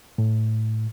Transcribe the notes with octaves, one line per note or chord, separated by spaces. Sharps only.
A2